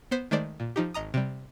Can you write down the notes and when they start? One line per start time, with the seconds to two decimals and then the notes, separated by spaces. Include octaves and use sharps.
0.11 B3 C5 B6
0.31 D#3 G#3 A3 C5 D5
0.60 A#2
0.76 F3 D#4 G4
0.94 G#1 D#5 A#5 D#6
1.14 C3 G3